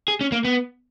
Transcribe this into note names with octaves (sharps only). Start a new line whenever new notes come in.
G#4
C#4
A#3
B3